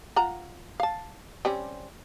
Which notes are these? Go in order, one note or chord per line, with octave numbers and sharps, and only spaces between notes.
F4 F#5 A#5
F5 A5
G3 C4 C#4